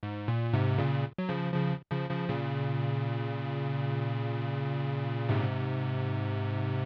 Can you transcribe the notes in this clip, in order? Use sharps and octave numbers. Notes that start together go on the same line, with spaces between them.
G#2
A#2
G#2 C3
A#2 C#3
F#3
C#3 F3
C#3 F3
C#3 F3
C#3 F3
A#2 C#3
G#2 C3